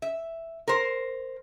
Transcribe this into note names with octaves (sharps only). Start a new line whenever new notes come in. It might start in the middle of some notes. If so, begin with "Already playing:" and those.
E5
A#4 C5